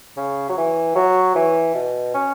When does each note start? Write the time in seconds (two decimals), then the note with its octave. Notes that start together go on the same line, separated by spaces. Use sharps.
0.17 C#3
0.49 F#3
0.57 E3
0.96 F#3
1.35 E3
1.74 B2
2.14 C#4